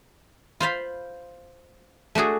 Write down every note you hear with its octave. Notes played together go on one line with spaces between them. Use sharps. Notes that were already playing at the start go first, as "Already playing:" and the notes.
F4 C5 F5 B5
A3 D4 F#4 G#4